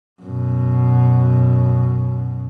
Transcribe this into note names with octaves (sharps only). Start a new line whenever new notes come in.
F#2 B2